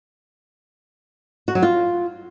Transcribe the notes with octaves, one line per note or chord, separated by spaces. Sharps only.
F#4
F#3
F4